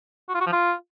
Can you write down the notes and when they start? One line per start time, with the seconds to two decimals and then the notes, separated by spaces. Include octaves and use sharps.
0.29 F#4
0.35 F4
0.41 F#4
0.46 F3
0.52 F4